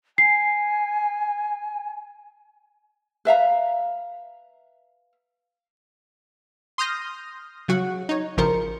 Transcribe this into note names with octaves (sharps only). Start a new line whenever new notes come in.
G#5 C7
B4 E5 F5 A#5
C6 D#6 F6 G6 A#6
C#3 F#3 F#4 F#5
D#4 C#5
A1 C#3 F3 A#4 C5 C#7